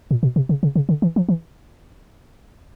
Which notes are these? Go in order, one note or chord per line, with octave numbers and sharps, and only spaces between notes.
A#2
B2
C3
C#3
C#3
C#3
D3
E3
F3
E3